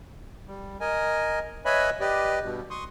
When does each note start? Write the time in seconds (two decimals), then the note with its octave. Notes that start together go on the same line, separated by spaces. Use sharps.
0.47 G3
0.81 A#4 D#5 G#5
1.65 B4 C#5 D#5 E5 G#5 B5
2.00 G4 B4 D5 D#5
2.43 G2 B2
2.70 C6 C#6 D#6